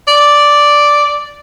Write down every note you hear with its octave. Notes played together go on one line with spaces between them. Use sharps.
D5